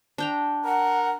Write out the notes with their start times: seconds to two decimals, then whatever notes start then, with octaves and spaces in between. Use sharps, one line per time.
0.18 D4 G5 A#5
0.65 A#4 F#5